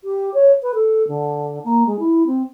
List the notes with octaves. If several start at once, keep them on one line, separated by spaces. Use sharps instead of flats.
G4
C#5
B4
A4
D3
A#3
G#3
E4
C4